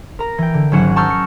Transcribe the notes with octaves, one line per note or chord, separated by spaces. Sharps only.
A#4 A#5
E3 G5
D3
G#1 F#3 C#4 F#5 F#6 E7
A5 A#5 C#6 E6 F6 G6
C#7